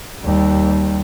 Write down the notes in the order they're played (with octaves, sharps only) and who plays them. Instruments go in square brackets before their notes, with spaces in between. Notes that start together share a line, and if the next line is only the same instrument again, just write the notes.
[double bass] D#2 G3